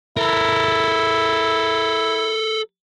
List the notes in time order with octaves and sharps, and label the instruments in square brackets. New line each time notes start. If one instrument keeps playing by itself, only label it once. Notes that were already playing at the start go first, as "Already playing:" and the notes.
[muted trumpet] E4 [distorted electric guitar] A4 A#4